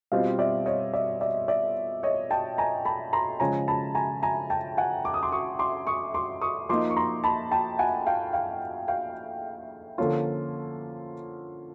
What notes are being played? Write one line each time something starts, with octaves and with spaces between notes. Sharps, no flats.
B2 G3 C4 F4 D#5 F5
D5 E5
C#5 D#5
D5 E5
D5 E5
D5 E5
C#5 D#5
G5 A5
G#5 A#5
A5 B5
A#5 C6
C#3 F3 G#3 C#4 G#5 A#5
A5 B5
G#5 A#5
G#5 A#5
G5 A5
F#5 G#5
D6
D#6
C6 D6
C#6 D#6
C6 D6
C#6 D#6
C6 D6
C#6 D#6
F3 A#3 D#4 C6 D6
C#6
A#5 C6
A5 B5
G5 A5
F#5 G#5
F5 G5
F5 G5
F5 G5
D3 F3 A#3 C#4 F4